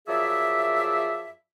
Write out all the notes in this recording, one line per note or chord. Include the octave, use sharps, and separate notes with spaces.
F#2 F3 G#4 D5 E5